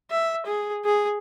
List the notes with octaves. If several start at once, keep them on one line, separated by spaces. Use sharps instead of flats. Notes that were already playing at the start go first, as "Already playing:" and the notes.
E5
G#4
G#4